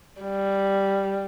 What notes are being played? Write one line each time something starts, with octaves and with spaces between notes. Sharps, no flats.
G3